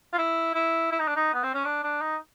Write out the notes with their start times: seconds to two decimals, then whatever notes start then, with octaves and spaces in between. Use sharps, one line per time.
0.13 F4
0.18 E4
0.55 E4
0.92 E4
1.00 D#4
1.08 D4
1.16 D#4
1.34 B3
1.44 C4
1.54 C#4
1.65 D4
1.84 D4
2.02 D#4